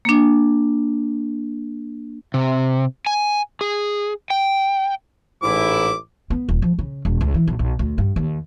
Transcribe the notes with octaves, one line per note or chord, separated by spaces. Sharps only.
A#3 D4
C3
G#5
G#4
G5
A1 G#2 E4 D6
B3
D#1
F3
C#3
E1
C#2
E3
B1
B1
D2
G2
D#2